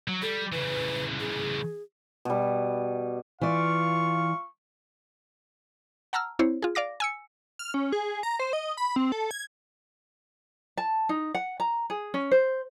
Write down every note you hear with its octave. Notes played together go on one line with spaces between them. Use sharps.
F#3
G3 A4
C#3 E3 B4
G#4
B2 G3
E3 F4 D5 F5 C#6
F#5 A5 A#5 E6 F6
C4 E4 C5 C#5
F4 G#4
D5 F5 D6 A#6
G#5 E6 C#7
F6
C#4
G#4
A#5
C5
D#5
B5
C4
A4
G#6
A5
D#4
F#5
A#5
G#4
C#4
C5